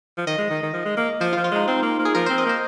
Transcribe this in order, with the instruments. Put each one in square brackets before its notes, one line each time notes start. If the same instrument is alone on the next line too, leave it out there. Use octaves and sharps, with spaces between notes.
[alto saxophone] F3
[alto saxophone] D#3 [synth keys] D#5
[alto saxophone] G#3
D#3
D#3
F3
G#3
A#3
[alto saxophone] F3 [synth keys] C5
[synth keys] F4
[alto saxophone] F3
[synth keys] F4
[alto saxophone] G#3 [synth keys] D#4
[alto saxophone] C4 [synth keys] F4
[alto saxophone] A#3
A#3
[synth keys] G#4
[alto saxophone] F3 [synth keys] A#4
[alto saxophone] C4 [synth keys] C5
[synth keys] D#5
[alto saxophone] A#3 [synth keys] C5